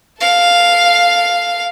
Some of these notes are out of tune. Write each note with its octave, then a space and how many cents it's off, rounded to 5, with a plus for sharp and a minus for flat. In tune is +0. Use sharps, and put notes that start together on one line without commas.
A4 +0 F5 +0